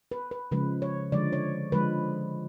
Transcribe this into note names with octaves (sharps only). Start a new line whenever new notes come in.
B4
B4
C#3 F3 G#3 B4
C#5
D3 F3 G#3 D5
C#5
D3 F3 G#3 B4